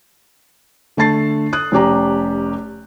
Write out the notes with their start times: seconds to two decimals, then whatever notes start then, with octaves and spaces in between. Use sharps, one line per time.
0.97 D3 A3 A5 A6 C7
1.53 D#6 F#6
1.72 F1 C#4 G4 A#5